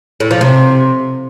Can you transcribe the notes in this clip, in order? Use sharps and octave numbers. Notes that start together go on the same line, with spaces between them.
A2
F3
C3